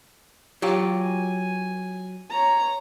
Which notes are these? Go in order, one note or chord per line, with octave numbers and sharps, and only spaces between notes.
F#3 F4 G4
G#5
C#5 A#5